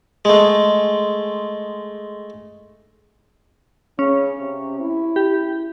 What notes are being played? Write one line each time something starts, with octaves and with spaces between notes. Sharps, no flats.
G#3 A3
C#3 C#4
C3
E4
G4